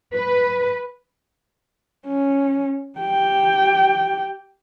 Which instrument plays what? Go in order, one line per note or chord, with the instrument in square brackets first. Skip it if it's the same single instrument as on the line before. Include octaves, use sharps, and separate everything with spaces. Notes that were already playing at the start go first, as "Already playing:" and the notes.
[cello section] B4
[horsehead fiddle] C#4
G4 G5